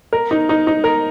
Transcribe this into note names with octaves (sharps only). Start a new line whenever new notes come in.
A#4
D#4
D#4
D#4
A#4